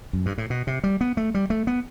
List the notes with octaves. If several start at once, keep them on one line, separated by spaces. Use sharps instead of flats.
F#2
G2
A2
B2
C3
G3
B3
A3
G3
A3
B3